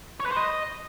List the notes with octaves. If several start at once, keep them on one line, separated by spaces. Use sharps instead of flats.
C#5
B4
C5
D#5